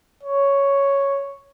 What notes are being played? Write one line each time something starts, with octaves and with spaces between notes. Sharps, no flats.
C#5